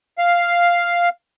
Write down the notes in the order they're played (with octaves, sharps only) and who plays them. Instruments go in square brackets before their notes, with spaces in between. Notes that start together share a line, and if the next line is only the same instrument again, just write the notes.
[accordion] F5